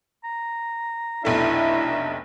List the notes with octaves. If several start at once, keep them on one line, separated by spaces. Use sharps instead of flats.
A#5
F1 B1 D4 E4 A4 E5 A#5